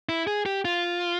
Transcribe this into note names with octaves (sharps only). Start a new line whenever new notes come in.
E4
G#4
G4
F4